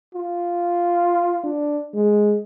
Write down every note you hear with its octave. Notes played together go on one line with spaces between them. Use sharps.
F4
D4
G#3